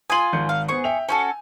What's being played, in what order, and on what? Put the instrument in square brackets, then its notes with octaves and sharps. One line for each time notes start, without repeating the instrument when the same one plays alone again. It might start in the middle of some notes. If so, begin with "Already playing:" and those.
[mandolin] F4 G#5 [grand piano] D#6 F#7
[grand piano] G#1 G6 C#7
[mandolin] F5
[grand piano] B3 C5 [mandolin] G#4 C#6
[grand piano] E5 G5 F7
[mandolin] C#4 F#4 A4 [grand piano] G#5